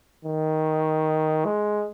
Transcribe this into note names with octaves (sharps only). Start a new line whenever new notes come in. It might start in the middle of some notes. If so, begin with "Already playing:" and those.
D#3
G#3